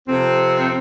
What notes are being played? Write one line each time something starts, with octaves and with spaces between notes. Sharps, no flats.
F2 C3 C4